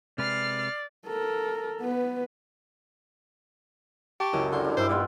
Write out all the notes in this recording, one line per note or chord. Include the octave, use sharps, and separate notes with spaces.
C3 G#3 B4 D5 F6 C7
A4 A#4
B3 B4
G4 A5 C#6
C#2 F#2 E4 D#5
D3 G3 D#5 C6
G3 D4
G2 D#3 E4 C5 D6
A#2 G3 B3 F4